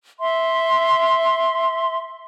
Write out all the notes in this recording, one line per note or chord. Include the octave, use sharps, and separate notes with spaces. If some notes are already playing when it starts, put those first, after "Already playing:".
E5 C6